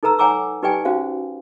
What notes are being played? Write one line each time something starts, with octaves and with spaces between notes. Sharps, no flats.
D#4 A4 B4 A#5 E6
C#5 F#5 G#5 A#5 D6 E6
D#4 G4 B4 D5 G5 G#5
C#4 F#4 C5 F5